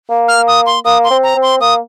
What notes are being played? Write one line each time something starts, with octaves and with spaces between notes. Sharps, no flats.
A#3
F6
D#6
C6
A#3 D#6
C6
C4
A#5
C4
C6
A#3 D#6